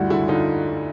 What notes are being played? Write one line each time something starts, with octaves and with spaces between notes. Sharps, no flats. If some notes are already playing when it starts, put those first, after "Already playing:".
Already playing: D2 G2 E4 F#4
D3 E4 F#4
D3 D#4 F4